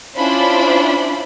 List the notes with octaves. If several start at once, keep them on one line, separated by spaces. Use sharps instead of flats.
C#4 D4 E4 F4 C5 B5